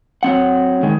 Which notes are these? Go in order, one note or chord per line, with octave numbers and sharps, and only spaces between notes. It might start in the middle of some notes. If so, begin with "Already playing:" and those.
F#3 C4 F#5
D#3 G#3